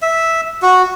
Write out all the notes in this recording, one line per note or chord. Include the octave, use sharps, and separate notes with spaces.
E5
F#4